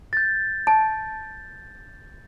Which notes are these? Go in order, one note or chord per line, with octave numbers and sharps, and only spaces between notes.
G6 A6
A5